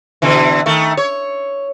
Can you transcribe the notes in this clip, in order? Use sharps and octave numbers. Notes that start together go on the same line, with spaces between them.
B2 D3 E3
D#3 A3
C#5